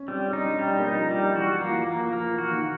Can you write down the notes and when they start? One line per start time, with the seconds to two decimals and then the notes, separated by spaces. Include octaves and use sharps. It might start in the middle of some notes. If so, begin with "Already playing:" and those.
Already playing: C#4
0.08 G3 C4
0.28 C#4
0.33 D4 D#4
0.59 G3 C#4
0.79 A#3
0.85 D#4
0.98 F3
1.11 G3
1.36 E3 F#4
1.55 F3
1.61 A#3
1.70 E3
1.74 F3
1.87 A#3
1.93 F3
2.12 F3 A#3
2.32 E3
2.38 F#4
2.51 D#3